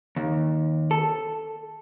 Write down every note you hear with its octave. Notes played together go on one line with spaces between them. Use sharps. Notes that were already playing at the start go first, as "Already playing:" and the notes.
D#2
A4